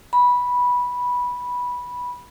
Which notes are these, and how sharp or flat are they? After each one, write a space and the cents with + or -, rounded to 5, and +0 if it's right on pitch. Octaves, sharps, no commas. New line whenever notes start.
B5 -10